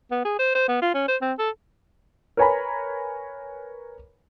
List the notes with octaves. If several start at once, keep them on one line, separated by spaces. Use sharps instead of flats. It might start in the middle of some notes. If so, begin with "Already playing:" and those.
B3
G#4
C5
C5
B3
F4
C#4
C5
C4
A4
A#4 B4 C#5 G#5 A#5 B5